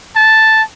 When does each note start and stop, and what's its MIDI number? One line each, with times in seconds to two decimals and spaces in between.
0.16 0.63 81